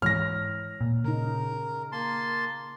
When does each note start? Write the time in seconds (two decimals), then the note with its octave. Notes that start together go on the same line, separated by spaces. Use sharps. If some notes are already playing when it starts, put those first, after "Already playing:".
0.02 G#2 E3 C#5 F6 A#6
0.81 A#2
1.04 C#3 D#4 A#4
1.92 A#3 A5 C6